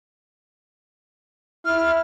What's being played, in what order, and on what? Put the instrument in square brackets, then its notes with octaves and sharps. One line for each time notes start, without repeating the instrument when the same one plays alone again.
[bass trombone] E4 [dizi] F6